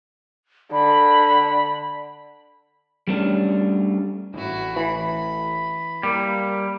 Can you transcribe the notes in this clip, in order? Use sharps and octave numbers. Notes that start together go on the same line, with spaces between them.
D3 B5
G3 A3 C#4 D4
A1 E4 F#4
E3 B5
G3 A#3